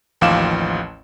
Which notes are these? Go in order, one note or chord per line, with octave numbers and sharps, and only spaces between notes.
A1 D#2 F3 F5 D6 E7